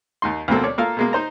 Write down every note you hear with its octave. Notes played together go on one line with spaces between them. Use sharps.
D#2 D#4 C6
D2 B2 F3 A#3 C4 A4
C#5 D5
A#3 F4 A4 A#4 F5
B2 G#3 A#3
D#4 C5 A#5